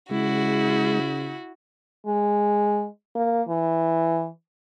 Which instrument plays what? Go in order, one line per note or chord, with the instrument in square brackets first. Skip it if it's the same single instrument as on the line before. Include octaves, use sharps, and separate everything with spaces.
[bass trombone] C#3 [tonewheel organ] G#3 [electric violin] E4 [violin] F#4
[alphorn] G#3
A#3
E3